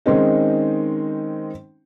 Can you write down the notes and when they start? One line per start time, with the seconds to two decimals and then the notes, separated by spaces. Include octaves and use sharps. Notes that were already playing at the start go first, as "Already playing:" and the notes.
0.06 D#3 G#3 C4 C#4 D#4